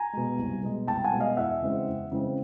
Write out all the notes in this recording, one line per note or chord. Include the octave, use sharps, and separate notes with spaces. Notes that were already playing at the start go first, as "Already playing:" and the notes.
Already playing: G#5 A#5
B2 G#3
C2
B2 G#3
C2 G5 A5
F#5 G#5
B2 G#3
D#5 F5
E2 E5 F#5
C#3 E3 G#3 C4
E2
C#3 E3 G#3 C4